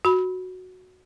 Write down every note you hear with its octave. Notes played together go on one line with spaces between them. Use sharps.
F#4 B5